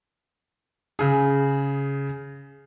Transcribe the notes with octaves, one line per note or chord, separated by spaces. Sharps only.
C#3 G#4